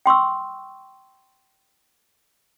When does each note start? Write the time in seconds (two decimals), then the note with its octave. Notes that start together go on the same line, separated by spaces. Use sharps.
0.06 G5 C6 C#6 E6